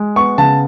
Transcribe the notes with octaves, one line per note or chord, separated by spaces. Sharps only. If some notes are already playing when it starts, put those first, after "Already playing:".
Already playing: G#3
B3 C#6
C#3 A5